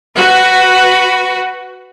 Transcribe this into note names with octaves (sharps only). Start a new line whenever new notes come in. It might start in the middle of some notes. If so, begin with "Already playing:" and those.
F#4 B4